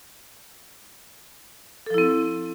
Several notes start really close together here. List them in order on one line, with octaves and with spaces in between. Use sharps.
A4 F3 E4 C4